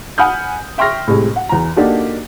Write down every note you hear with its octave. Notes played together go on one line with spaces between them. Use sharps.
F#5 G#5 B5 D#6 F6 G6
E5 G5 C6 C#6 F6 A#6
A2 C3 G#3
F#5
E2 A#5
A#3 D4 D#4 F#4 G4 A4